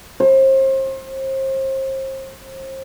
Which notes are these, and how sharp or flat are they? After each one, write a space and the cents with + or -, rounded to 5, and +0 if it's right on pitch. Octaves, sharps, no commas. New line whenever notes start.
C5 +35